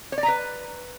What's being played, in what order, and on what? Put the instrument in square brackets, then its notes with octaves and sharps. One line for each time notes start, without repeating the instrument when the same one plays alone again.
[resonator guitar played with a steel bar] C#5
D5
A#5
B4